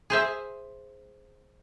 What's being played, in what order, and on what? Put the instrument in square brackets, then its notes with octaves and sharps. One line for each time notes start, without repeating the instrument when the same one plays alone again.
[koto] G#4 C5 E5